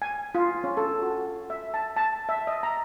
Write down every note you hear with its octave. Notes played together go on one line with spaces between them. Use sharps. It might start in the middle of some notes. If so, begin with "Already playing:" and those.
G#5
F4
C#4
A4
F#4
E5
A5
A5
E5
D#5
A#5